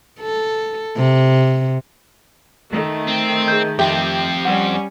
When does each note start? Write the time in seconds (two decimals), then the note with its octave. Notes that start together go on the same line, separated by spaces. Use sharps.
0.20 A4
0.97 C3
2.70 D#3 A3
3.08 C4
3.48 G#4 G6
3.79 F2 C4 G4 E5
4.45 G3 C#4 F#5